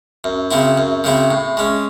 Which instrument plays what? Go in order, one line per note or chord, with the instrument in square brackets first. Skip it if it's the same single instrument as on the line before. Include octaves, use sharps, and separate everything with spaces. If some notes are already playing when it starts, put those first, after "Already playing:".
[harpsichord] F#2
C#3 F#3 C4 E4
F#2
C#3 F#3 C4 E4
A2
G#3 C#4